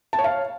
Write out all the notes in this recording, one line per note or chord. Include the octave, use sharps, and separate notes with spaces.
A5
C#5
F5